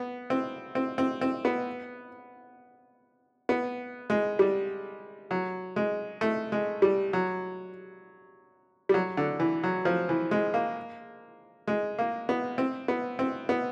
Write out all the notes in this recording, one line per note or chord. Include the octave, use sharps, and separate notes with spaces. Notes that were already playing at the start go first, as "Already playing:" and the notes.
Already playing: B3
C4
C4
C4
C4
B3
B3
G#3
G3
F#3
G#3
A3
G#3
G3
F#3
G3
F#3
D3
E3
F#3
F3
E3
G#3
A#3
G#3
A#3
B3
C4
B3
C4
B3